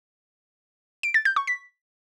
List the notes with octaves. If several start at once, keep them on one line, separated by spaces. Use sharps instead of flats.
D7
A6
G6
C#6
B6